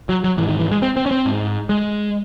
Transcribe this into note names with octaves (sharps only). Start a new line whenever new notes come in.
F#3
F#3
G#2 E3
D#3
E3
G#3
C4
C4
C#4
C4
G#2
G#3